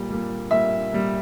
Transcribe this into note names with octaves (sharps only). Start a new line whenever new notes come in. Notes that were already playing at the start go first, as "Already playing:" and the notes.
Already playing: A#2 G3
A#2 G3
A#2 G3 E5
A#2 G3